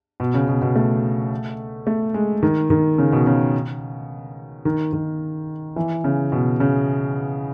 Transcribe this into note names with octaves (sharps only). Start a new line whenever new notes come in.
B2
C#3
B2
B2
A3
A3
G#3
D#3
D#3
C#3
B2
C#3
D#3
D#3
E3
C#3
B2
C#3